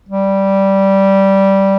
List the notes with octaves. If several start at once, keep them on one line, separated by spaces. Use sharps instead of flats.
G3